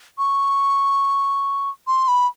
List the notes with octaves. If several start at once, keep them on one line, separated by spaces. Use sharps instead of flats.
C#6
C6
B5